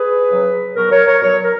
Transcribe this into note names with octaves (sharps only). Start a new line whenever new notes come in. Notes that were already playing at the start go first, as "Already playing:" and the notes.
Already playing: G#4 B4
C#3 F#3
B2 F#3 F#4 A#4
A#4 C#5
A#4 C#5
B2 F#3 A#4 C#5
A#4